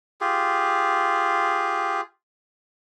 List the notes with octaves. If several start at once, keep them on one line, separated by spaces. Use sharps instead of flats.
F4 G4 G#4